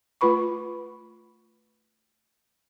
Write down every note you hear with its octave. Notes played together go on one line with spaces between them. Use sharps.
A3 F4 B4 B5 C#6